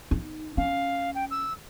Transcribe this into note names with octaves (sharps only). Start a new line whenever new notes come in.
D#4
C#4 F5
G5
E6